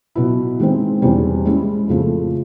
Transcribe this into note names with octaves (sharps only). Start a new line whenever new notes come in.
B2 F#3 B3 E4
D#3 G#3 C4
E2 B2 G3 C4
G#3 C#4 E4
F2 C#3 F3 A3